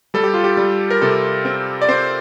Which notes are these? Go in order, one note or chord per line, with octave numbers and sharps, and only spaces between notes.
G3 A4
G4
F4
G4
G3
A#4
C3 A4
C4
D5
C4 C5